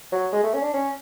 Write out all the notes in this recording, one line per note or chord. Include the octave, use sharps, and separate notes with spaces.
F#3
G#3
A3
C#4
D4
C#4